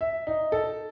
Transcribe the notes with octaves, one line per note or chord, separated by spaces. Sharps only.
E5
D#4
A4